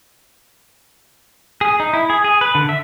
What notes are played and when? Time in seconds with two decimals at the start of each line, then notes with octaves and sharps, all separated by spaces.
1.61 G#4
1.80 D#4
1.93 E4
2.10 G#4
2.24 G#4
2.41 B4
2.55 D3
2.69 E5